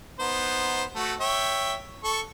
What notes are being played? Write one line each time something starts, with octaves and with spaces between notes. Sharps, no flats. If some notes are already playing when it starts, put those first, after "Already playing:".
B3 D#4 C5
A3 F#4
C#5 E5 G5
A4 C#6